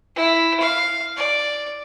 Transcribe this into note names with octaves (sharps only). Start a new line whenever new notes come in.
E4
F5
D5